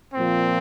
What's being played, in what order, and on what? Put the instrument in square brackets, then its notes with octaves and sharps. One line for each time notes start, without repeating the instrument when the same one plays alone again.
[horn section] A#2 F3 C4